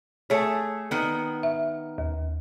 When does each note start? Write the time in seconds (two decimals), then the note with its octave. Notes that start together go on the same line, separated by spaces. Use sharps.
0.30 A3 G#4 C#5
0.91 D#3 B3
1.43 E5
1.98 D#2